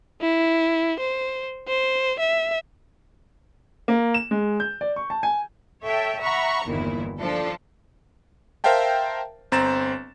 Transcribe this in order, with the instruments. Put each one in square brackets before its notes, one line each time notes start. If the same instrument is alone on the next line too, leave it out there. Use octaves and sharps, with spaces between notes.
[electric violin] E4
C5
C5
E5
[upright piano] A#3
E7
G#3
G6
D5
C#6
A5
G#5
[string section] A4 C#5 E5 G5
E5 F#5 A#5 B5 C#6
G1 E2 A#2 D#3 E4
F3 D4 A4
[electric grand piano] A#4 C5 E5 F5 G5 A5
G1 C4 A#5 A6 E7